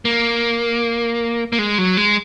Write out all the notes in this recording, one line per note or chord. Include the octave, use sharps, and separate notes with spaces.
A#3
A#3
G#3
F#3
G#3